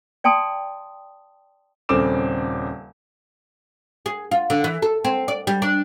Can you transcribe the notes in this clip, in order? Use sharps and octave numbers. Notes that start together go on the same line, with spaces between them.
D5 G5 A5 C6 D#6
D#1 C#3 C4 A4 D6 E7
G#4
F4
D3
E3
A4
C4
D5
G3
D4